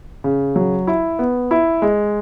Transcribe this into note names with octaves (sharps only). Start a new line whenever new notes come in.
C#3
F#3
E4
B3
E4
G#3